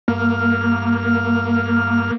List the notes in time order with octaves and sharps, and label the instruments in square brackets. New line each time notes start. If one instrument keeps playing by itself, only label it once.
[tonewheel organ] G2 F6 [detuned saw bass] A#3